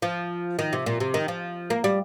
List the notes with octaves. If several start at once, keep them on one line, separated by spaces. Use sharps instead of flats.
F3
D#3
C3
A#2
C3
D#3
F3
A#3
G3